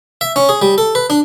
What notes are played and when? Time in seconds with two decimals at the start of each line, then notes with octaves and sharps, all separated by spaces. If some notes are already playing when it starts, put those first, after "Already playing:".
0.21 E5
0.36 C#4
0.49 G#4
0.62 G3
0.78 A4
0.95 B4
1.10 D4